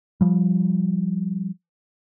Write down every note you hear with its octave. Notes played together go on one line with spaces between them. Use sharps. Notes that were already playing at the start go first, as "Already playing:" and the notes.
F3 G3